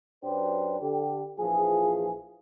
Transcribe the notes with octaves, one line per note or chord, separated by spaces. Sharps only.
F#2 F#3 D4 G4 B4 C5
D3 G4
A#1 E3 F3 G#4